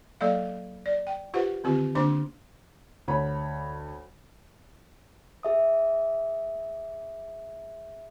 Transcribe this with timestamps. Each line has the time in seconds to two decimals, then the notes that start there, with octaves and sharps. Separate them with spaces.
0.21 F#3 A#3 A4 D5 F5
0.86 D5
1.07 G5
1.34 F4 G4 B4 C5 F#5
1.64 D3 D#3 C4 F4 G4
1.95 D3 A#3 D4 C5 C6 D6
3.08 D2 C#5 B5
5.43 G#4 E5 D#6